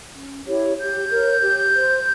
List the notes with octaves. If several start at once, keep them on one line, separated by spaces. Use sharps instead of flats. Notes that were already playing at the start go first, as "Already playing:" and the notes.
C#4
E4 G4 C#5
G4 G6
A#4 C#5
G4
C5